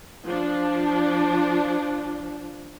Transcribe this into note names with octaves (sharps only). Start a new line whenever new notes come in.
F3 D4